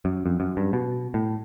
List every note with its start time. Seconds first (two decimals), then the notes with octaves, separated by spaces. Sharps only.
0.05 F#2
0.26 F2
0.40 F#2
0.57 G2
0.73 B2
1.14 A2